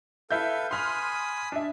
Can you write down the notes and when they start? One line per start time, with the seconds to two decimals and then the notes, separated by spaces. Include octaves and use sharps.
0.31 E4 A4 B4 E5 F5 G6
0.71 G#5 B5 C6 D#6 F6 F#6
1.52 D4 E5